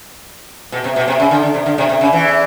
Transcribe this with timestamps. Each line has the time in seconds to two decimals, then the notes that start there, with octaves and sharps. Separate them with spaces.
0.72 B2
0.84 C3
0.96 B2
1.08 C3
1.20 C#3
1.31 D3
1.43 D3
1.54 C3
1.66 D3
1.78 C3
1.89 C3
2.01 C#3
2.13 E2 E3